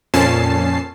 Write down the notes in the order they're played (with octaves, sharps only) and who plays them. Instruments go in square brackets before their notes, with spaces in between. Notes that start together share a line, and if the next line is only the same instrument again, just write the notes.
[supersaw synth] F2 A#2 C#4 A5 C7